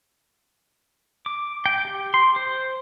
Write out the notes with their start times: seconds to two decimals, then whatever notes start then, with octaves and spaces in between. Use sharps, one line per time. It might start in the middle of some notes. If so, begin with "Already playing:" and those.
1.26 D6
1.66 G5
1.85 G4
2.14 C6
2.36 C5